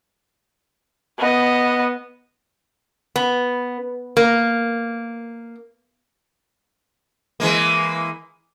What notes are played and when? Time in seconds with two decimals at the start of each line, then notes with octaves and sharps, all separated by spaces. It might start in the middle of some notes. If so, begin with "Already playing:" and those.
1.19 B3 D#5
3.16 B3
4.17 A#3
7.40 E3 G#3 A#3